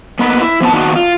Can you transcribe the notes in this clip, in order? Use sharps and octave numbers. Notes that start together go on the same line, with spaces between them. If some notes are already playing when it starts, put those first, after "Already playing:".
A#3 B3 D#4 B4
E4
F3 B3 B4 A5
D#3 A#3 B3 D4 D#4 F#4
F4